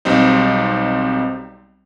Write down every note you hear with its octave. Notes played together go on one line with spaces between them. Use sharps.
B1 G3 C4 D#4